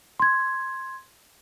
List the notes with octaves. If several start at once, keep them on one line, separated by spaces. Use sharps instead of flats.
C6 G#6